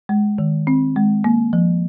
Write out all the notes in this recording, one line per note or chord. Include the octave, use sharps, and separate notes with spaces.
G#3
D#3
C4
G#3
A#3
F3